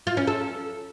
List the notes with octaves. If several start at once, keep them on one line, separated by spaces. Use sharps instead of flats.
F4
C#4
A4